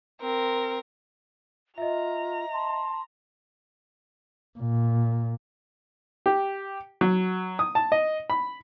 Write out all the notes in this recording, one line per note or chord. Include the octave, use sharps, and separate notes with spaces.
C4 A#4
F4 D#5 E5 A#5
A5 C6
A#2
G4
F#3
D#6
A5
D#5
B5